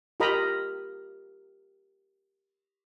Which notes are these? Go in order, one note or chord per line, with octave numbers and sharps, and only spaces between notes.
F4 G4 A#4 D#5 A#5 B5